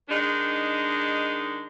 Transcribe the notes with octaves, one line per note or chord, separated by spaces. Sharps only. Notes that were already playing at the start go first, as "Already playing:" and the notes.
D#3 G#3 D4 D#4